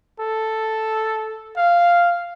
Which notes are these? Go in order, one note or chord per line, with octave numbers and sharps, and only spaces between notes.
A4
F5